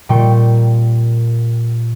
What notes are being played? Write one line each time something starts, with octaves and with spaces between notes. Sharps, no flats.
A#2 G3 G5 C#6